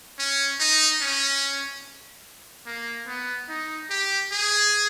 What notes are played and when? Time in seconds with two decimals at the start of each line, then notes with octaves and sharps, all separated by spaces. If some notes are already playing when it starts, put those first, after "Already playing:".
0.19 C#4
0.60 D#4
1.01 C#4
2.67 A#3
3.07 B3
3.49 D#4
3.90 G4
4.32 G#4